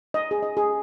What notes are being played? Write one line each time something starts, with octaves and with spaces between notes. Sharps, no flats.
D#5
G#4
D#5
G#4